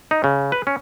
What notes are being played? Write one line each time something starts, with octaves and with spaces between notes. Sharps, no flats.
D#4
C#3
B4
C#4